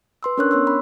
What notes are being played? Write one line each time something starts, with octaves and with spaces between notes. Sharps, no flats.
B4 C6 E6
C#4 D4 A#4 C#5 C#6 F#6
B3 C#5 C6 E6
B5